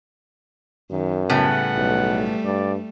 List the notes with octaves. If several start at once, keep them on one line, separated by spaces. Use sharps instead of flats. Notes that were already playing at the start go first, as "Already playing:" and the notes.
F#2 D#3
A2 C#3 G3 A3 B3 F#5
B1
G2 D5